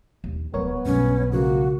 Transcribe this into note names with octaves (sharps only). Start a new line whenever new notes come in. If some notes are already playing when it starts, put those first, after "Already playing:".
D#2
D1 G3 B3 A#4 C#5
B1 G2 C#4
C#3 F3 G#3 A#3 F#4